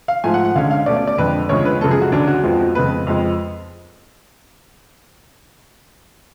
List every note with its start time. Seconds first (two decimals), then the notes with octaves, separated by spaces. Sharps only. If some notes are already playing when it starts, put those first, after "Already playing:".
0.08 F5
0.24 G#2 F3 A3 G#5
0.34 F#5
0.45 F#5
0.55 D2 D3 G#3 C#4 F5
0.71 F5
0.86 B2 A3 C#4 D5
0.97 D5
1.07 D5
1.18 F2 D3 G#3 B4
1.49 D2 C#3 F3 G#3 C#5
1.65 B4
1.81 F#2 C#3 F3 G#3 A4
1.91 G#4
2.02 F#4
2.12 D2 D3 F#3 C#4 D4
2.27 F#4
2.43 F2 F3 G#3 B3 F4
2.60 F#4
2.75 F2 C#3 G#3 B3 B4
3.07 F2 F3 G#3